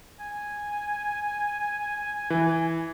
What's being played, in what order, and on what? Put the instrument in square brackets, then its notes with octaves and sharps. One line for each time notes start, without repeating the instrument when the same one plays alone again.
[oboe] G#5
[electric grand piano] E3